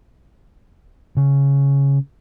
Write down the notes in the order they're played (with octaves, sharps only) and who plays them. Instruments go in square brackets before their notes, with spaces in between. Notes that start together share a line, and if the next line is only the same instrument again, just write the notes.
[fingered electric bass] C#3